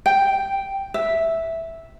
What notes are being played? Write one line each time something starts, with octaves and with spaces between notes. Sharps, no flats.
G5
E5